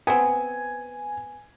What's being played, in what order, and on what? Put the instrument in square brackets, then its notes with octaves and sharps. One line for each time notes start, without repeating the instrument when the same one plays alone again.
[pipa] B3 C4 [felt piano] G#5